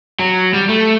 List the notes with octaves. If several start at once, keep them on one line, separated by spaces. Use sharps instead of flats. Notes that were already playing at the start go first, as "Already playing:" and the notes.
F#3
G3
A3